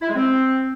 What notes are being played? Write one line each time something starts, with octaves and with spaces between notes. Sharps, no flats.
E4
G#3
C4